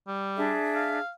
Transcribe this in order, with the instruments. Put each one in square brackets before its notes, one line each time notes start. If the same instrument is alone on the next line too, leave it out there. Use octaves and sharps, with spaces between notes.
[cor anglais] G3
[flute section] D4 G#4 E5
[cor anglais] F5